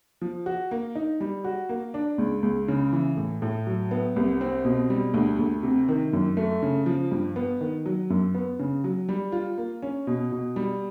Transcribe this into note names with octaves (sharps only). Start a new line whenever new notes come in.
F3
F#4
A#3
D#4
G3
F#4
A#3
D4
C#2
C#2
C#3
E3
A2
A2
F#3
B3
C2
C4
B2
G3
D2
D2
C3
D#3
F#2
A3
C#3
F3
G2
B3
D#3
F#3
F#2
B3
C#3
F#3
G3
F4
A#3
C#4
B2
B2
G3